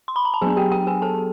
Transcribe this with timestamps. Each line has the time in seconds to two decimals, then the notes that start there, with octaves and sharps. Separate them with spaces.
0.08 C6
0.16 B5
0.25 A#5
0.34 A5
0.42 F#3 B3 D4 G#4 G#5
0.57 G4 G5
0.72 G4 G5
0.87 G#4 G#5
1.02 A4 A5